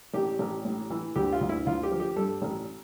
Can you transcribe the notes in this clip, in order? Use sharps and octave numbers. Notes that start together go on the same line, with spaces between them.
A1 G4
A1
A2
E3
D2 G4
F4
D2
E4
D2 F4
G4
F3
G4
G2 A4
A1